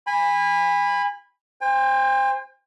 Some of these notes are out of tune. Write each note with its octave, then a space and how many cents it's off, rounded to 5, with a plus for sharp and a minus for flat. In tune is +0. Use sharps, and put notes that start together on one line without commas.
G#5 -30 B5 +0
C5 +0 G5 +45